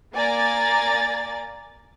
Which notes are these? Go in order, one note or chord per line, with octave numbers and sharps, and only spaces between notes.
A#3 D5 G#5 A#5 A6